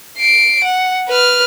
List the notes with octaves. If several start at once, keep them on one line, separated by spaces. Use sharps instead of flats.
C7 D7
F#5
B4 F6